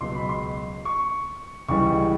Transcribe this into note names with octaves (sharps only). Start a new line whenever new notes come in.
C#2 B2 F#3 C6
B5
C6
C#6
C#2 C#3 E3 G3 C#6